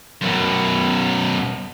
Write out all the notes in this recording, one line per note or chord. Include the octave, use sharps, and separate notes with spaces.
F#2 B2